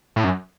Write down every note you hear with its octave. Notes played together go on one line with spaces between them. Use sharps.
A2
F#2